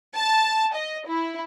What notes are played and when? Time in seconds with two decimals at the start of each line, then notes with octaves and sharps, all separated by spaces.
0.15 A5
0.75 D#5
1.07 E4